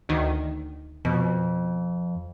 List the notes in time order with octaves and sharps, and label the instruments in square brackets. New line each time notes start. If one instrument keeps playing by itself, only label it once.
[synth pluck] D2 D#3
[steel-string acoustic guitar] F2 [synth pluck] B2